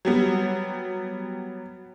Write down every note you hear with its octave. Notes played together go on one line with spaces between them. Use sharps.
F#3 G3 B3